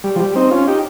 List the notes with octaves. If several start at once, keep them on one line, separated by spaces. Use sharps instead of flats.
G3
F3
G3
C4 D#4
C#4 F4
D#4 G4